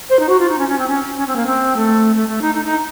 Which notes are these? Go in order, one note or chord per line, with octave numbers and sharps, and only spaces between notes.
C5
D#4
F#4
F4
D#4
C#4
C#4
C4
C#4
C#4
C4
A#3
C4
A3
A3
A3
D#4
D#4
D#4